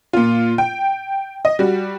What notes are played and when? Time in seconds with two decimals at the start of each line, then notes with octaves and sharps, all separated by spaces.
0.13 A#2 F4
0.58 G5
1.45 D#5
1.59 G3 F#4